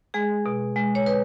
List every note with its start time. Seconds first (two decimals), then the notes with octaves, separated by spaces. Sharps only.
0.14 G#3 G#4
0.46 B2
0.76 G#3
0.95 C#5
1.06 B4